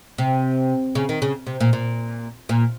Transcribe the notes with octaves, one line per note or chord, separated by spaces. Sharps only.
C3
C#3
D#3
C#3
C3
A#2
A#2
A#2